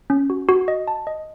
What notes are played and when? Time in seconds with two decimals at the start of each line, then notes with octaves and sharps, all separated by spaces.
0.10 C#4
0.30 F#4
0.49 F#4
0.68 D#5
0.88 A5
1.07 D#5